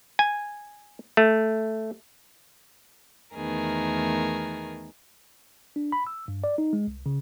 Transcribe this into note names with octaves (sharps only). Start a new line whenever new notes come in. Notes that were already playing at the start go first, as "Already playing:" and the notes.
G#5
A3
E2 D#3 A3 B3 G#4 A#4
D4
B5
E6
G2
D5
D#4
G#3
C2
C#3